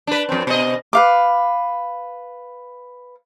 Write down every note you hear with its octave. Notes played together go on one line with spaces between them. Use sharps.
D4 B4
F2 C4
B2 D#5
B4 F5 D6